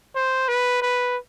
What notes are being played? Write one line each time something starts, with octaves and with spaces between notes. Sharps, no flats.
C5
B4
B4